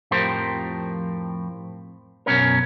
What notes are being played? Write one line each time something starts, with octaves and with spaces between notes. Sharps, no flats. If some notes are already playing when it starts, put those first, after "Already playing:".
F2 A2 F3 G4 A#4 C5
F#2 B2 C#4 A#4